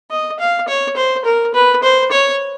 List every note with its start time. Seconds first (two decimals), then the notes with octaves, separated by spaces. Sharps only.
0.11 D#5
0.39 F5
0.68 C#5
0.96 C5
1.25 A#4
1.54 B4
1.83 C5
2.11 C#5